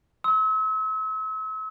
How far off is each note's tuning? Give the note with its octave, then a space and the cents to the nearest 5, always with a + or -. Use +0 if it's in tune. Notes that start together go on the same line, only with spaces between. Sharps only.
C6 +0 E6 -40